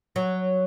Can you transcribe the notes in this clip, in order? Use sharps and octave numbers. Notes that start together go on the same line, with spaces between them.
F#3